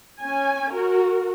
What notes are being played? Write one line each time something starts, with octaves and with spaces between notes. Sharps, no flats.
C#4 G#5
F#4 A#4